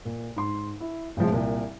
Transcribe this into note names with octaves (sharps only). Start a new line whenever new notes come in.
A#2
G#2 C6
E4
A1 C3 F3 G#3
C2 A#2